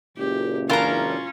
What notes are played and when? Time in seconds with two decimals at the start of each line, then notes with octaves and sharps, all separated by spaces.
0.17 F#1 C#2 A#2 G4
0.70 E3 C#4 D4 F4 A#4 A#5